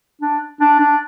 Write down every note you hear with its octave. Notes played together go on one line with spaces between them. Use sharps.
D4
D4
D4